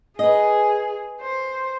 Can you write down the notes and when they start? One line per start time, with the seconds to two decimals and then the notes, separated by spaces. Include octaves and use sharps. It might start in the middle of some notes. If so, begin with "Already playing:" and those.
0.19 G#4 B4 D#5
1.21 C5